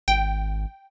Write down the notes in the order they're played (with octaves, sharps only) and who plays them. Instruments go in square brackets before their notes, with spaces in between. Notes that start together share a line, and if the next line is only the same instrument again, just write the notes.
[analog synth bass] G#1 [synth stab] G5